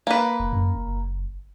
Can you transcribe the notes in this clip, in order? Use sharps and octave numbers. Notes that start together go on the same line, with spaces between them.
A#3 B4
F1
F#2
F#1